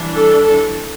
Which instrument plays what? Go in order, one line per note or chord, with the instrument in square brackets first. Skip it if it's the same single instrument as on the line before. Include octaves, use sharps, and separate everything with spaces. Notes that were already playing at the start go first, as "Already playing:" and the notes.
Already playing: [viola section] E3 G3 D4
A4
A4